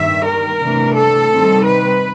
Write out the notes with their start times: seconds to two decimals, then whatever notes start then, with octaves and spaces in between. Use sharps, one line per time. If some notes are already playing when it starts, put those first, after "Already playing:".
Already playing: G2 D#3 G3 E5
0.26 A#4
0.60 C3 E3 A3 D4
0.96 A4
1.31 C3 D#3 G3 C4 D#4
1.66 B4